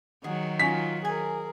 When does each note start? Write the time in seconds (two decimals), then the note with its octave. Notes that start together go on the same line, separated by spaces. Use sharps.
0.24 D#3 F#3 G#4 F#5
0.59 C#4 D#4 F4 B6
1.05 G#4 A#4 G#5